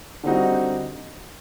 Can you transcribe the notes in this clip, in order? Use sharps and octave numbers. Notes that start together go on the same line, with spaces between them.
D3 G3 C4 D#4 F#4